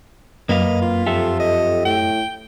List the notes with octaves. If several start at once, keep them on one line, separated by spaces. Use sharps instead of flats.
F#2 A#3 B4 D#5 F5
F4
F2 G4 A4 E5
D#5
A2 G5